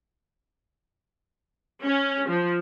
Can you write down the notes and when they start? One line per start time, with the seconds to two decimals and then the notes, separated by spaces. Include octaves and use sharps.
1.84 C#4
2.29 F3